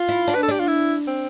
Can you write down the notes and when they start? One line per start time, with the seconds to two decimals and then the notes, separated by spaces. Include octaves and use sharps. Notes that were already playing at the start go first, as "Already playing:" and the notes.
Already playing: F4
0.09 E4
0.28 D4
0.35 B4
0.43 A4
0.48 D4 G4
0.60 F4
0.68 E4
1.07 C4